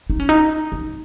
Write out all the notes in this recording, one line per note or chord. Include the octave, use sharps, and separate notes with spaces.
D#4
C#4
D#4
D#4